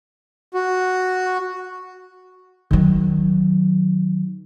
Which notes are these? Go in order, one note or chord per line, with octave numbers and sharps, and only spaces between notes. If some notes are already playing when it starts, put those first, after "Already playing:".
F#4
D#3 F#3